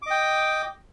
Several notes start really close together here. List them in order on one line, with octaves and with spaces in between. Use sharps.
D6 D#5 G5